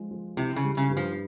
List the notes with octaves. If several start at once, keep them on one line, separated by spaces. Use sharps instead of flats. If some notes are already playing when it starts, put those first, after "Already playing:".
Already playing: F3 G#3
F3
C3 E4
C#3
G3
C#3
G2
F3